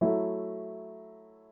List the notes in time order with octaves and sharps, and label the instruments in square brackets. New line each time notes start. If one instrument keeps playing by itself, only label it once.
[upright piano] F#3 A3 E4